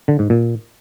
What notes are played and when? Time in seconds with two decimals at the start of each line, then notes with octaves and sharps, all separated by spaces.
0.08 D3
0.19 G#2
0.30 A#2